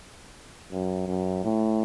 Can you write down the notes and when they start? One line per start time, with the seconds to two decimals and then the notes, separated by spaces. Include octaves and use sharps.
0.71 F#2
1.07 F#2
1.44 A2